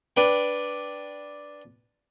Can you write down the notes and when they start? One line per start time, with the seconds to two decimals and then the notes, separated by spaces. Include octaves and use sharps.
0.17 D4 B4 G5